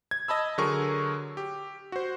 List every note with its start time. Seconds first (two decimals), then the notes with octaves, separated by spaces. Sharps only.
0.11 G#6
0.28 D#5 A5 B5 E6
0.58 D3 F#3 G#4 A#4 C#6
1.37 G4
1.92 F#4 C5